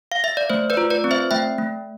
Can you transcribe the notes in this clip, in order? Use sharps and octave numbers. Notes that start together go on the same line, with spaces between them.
F5
E5
D5
A3 C5
B4 D5
F4
B4 D5
C4
C5 E5
A3 E5 G5
A3